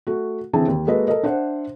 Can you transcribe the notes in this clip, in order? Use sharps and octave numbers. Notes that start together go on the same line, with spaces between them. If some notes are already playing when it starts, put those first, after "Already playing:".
A3 F#4
D3 E3 C4 G#4 A5
D#2
G#3 A#3 F#4 A4 B4 D#5
A4 A#4 D#5
D4 C5 E5 F#5